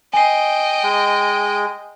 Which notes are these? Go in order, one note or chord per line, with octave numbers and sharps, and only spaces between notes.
D#5 G5 G#5 C7
G#3